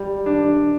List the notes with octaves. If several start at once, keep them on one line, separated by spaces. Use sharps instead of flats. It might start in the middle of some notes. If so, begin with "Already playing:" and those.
Already playing: G3
D4